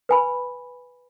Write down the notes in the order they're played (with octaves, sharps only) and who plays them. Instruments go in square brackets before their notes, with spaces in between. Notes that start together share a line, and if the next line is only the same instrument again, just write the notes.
[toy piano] B4 G#5 B5